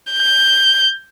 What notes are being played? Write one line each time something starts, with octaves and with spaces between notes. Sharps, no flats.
G6